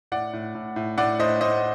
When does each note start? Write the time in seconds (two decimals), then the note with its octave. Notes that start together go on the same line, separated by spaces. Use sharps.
0.12 A2 D5 F#5
0.33 A2
0.55 A2
0.76 A2
0.98 A2 D5 F#5
1.19 A2 C5 D#5
1.41 A2 C5 D#5